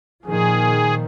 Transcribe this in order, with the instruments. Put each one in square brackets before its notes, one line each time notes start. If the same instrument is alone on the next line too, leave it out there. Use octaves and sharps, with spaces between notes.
[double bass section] A#2 D#3 F3 [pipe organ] G#4